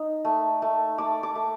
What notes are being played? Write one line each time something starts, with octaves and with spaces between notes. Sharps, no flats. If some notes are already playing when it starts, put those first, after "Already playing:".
Already playing: D#4
A3
A3
A3 D6
D6
A3